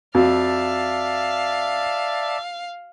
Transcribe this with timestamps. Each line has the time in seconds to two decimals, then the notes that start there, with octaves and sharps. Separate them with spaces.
0.15 F2 F#4 D5 E5 F5 A5